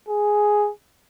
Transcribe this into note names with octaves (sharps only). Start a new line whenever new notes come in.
G#4